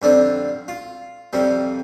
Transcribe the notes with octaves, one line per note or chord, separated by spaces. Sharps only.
F2 D3 G3 C4 D4
F4
F2 C3 G3 C4